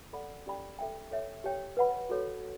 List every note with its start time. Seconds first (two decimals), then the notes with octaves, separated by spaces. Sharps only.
0.13 A4 D5 F#5 B5
0.46 C#4 G4 D5 G5 B5
0.79 A4 E5 G5
1.11 A4 C#5 E5
1.44 G4 C#5 G5
1.77 B4 F#5 B5
2.10 F#4 A4 C#5